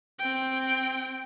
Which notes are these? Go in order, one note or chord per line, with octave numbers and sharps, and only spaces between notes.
C4 G5